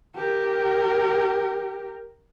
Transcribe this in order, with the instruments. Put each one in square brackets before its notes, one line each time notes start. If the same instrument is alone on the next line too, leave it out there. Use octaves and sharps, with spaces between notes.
[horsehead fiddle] G4 A#4